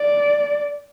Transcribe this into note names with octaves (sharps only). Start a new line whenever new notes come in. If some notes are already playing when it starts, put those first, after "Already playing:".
Already playing: D5